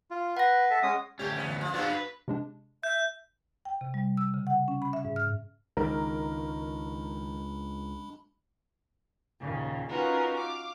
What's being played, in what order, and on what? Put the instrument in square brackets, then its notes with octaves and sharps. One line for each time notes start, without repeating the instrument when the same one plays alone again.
[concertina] F4
[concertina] B4 [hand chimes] F#5 A#6
[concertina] A4 E5
G#3 C#4 D#6
[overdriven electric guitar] D2 C#4 [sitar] A3 G4
[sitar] E2 B3
F3
[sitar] G2 F#3 B3 [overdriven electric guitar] D4 F4
[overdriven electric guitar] B4
[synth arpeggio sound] C3 G#3 D4
[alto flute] E5 [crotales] G6
[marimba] G5
C3
G3
E6
C#3
F#5
C#4
B5
E5
G#2
F6
[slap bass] C#2 [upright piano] D#3 [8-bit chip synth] G#3 D4 B5 [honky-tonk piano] A#4
[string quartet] D#2 A#2 C#3
C#4 D#4 F4 F#4 A#4 B4
F5 D6